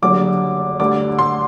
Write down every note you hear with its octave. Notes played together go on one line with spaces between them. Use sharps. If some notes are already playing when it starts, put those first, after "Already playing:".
F#1 F#2 D3 G3 D6
D2 D3 G3 D6
C6